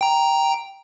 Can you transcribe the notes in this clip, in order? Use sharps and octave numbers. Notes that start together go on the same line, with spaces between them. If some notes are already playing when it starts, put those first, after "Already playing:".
G5 A#5